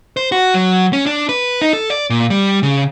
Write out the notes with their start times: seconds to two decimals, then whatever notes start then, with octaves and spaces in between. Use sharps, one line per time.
0.17 C5
0.32 F#4
0.55 F#3
0.93 C#4
1.06 D4
1.29 B4
1.62 D#4
1.73 A4
1.90 D5
2.10 A#2
2.30 G3
2.63 C#3